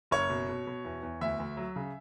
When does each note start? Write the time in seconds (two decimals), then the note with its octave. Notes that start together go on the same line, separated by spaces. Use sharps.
0.11 F#1 C#5
0.30 B2
0.49 B2
0.67 B2
0.85 E2
1.03 E2
1.21 D2 E5
1.40 D2
1.57 F#3
1.76 C#3